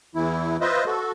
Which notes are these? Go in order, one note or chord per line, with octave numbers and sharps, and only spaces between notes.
E2 E3 E4
F4 B4 C5 D#5 E5
F#4 A4